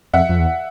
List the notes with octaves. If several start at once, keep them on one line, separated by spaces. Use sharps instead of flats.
F2 E5 F#5
F2
E2